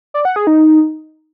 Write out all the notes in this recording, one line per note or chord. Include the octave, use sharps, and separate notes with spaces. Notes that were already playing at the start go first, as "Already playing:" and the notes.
D5
F#5
G#4
D#4